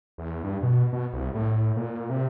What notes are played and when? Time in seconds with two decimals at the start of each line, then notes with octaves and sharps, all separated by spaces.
0.18 E2
0.44 G2
0.62 B2
0.92 B2
1.13 C2
1.34 A2
1.76 A#2
2.09 C3